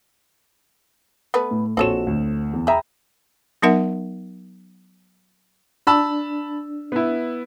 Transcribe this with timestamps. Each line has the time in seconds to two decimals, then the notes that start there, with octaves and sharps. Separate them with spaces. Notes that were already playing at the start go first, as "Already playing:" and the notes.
1.34 A3 B3 B4
1.51 A2
1.77 A#1 C4 F#4 A4 C#5 E7
2.07 D2
2.53 E2
2.67 G#4 E5 G5 A#5 B5
3.62 F#3 B3 D#4 A#4 E5 F#5
5.87 D4 A5 B5 E6
6.92 B3 E4